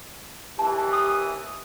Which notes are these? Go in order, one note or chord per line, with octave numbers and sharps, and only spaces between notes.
D#2 E3 G4 A5
D#6